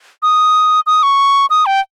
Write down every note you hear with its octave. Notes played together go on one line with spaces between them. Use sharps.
D#6
D#6
C#6
D#6
G5